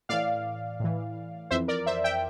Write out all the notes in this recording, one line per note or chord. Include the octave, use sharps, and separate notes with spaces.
A2 E3 D5 F5
A2 E3
F2 E3 C5 E5
A#4 D5
C5 E5
E5 G5